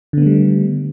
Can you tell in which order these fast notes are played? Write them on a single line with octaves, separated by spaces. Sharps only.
D3 B3 A3 G3